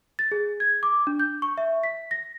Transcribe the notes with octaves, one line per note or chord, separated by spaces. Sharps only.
A6
G#4
G#6
D6
D4
G6
C#6
E5
B6
A#6